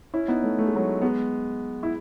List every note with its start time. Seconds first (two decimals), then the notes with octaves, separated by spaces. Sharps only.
0.14 C#4 E4
0.28 B3 D#4
0.43 A3 C#4
0.58 A3
0.66 G#3
0.76 F#3 A3
1.02 G#3 B3
1.83 E4